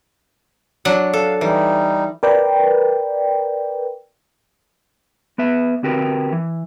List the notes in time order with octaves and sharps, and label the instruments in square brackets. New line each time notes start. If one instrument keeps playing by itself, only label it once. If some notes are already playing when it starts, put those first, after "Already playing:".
[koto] F#3 D4 F#5
[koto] A4 [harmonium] F5
[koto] E3 [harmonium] G3 D#4
[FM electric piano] A#4 B4 D5 G5
[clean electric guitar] B3 B4 E5
D3 C4 F#4 G4 A#4 B4
E3